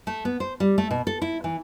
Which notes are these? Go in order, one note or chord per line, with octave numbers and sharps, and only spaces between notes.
A3
B3
C5
G3
A3
B2
A4
E4
E3